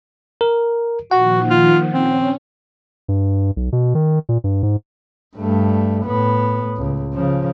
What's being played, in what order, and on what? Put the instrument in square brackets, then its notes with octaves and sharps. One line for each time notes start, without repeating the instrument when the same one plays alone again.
[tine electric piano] A#4
[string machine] A#2 D#3 F3 [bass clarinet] F#4 [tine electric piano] F#5
[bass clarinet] F4
[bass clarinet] C4 [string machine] C#4
[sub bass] G2
B1
B2
D#3
A#2
G2
G#2
[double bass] G2 A3
A2 B3
C#2
C#3 F3